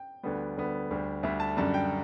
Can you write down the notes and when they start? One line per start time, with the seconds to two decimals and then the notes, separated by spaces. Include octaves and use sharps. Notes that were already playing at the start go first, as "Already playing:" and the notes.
Already playing: G5
0.23 D2 D3 G3 B3
0.57 D2 D3 G3 B3
0.91 D2 D3 G3
1.23 D2 D3 G3 E5
1.40 A5
1.57 F#2 D3 G3 A5
1.74 G5